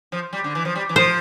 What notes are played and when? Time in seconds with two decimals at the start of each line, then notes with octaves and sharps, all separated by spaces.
0.12 F3
0.33 G3
0.44 D3
0.55 E3
0.65 F3
0.75 G3
0.89 E3
0.96 F3 C5